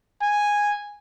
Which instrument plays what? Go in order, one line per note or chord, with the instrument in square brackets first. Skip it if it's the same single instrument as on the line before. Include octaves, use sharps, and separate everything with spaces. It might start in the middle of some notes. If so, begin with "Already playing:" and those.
[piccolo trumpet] G#5